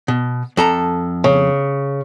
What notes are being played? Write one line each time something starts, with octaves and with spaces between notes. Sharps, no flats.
B2
F2 A4 A#5
C#3